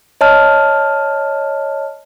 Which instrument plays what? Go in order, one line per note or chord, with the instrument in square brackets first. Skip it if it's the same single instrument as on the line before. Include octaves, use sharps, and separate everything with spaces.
[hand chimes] C#5 D#5 A5 F6